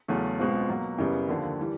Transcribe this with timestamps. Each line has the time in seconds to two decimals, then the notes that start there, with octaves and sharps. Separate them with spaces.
0.08 E2 C#3 F#3 A3 C#4
0.39 C#2 B2 G#3 C4 F4
0.69 B2 F#3 A#3
0.98 F#2 C#3 E3 G3 B3
1.28 D#2 D3 F3
1.60 E3 G3